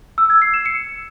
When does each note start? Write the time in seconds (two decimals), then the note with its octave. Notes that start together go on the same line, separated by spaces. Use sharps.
0.18 E6
0.30 G#6
0.42 C7
0.54 E7
0.66 C#7